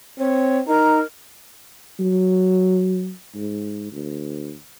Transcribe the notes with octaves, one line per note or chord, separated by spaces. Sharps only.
C4 C#5
D#4 A#4 A#5
F#3
G#2
D2